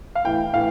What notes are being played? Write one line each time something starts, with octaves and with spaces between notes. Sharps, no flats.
F5
A2 E3 G5
A2 E3 F5